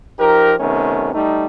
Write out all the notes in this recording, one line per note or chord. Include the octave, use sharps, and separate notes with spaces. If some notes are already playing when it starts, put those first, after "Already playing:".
F3 D#4 G4 A#4
C3 D#3 A3 B3 C#4
G3 A3 D#4